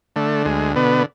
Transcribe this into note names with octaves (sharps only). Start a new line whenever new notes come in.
D3 A3
D2 G#3
B2 D3 B3